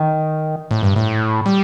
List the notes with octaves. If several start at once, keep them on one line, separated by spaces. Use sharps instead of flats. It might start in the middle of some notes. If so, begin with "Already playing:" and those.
Already playing: D#3
A2
G2
A2
G3